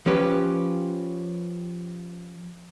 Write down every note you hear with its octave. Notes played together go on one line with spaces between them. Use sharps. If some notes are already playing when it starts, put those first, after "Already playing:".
F3 C#4 G4 B4